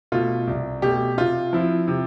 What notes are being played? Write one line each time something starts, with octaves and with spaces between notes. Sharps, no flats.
B2 A3 F4
C2
B2 A3 G4
C3 F4
F3 C4 E4
C3